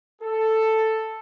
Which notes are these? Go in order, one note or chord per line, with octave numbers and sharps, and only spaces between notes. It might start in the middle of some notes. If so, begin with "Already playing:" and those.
A4